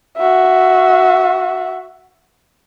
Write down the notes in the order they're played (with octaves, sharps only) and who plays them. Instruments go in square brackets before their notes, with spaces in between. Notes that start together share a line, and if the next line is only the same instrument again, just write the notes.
[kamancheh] F#4 E5